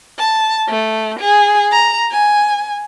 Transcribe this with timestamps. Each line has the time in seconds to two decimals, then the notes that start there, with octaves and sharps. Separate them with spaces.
0.19 A5
0.69 A3
1.20 G#4
1.72 A#5
2.12 G#5